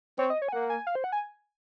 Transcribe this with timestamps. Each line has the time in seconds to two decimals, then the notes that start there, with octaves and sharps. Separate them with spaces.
0.18 C4 C#5
0.30 D#5
0.42 C#5
0.48 G#5
0.52 A#3 F#5
0.70 G#5
0.87 F5
0.95 C5
1.04 F#5
1.12 G#5